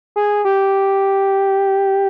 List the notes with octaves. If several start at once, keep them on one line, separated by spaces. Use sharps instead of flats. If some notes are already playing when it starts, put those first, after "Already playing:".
G#4
G4